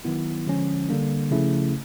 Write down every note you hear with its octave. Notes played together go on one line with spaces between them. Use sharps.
D#3 F#3 B3 E4
D3 F3 G#3 C#4
D3 G3 A#3 D4
C#3 F3 A3 C#4 E4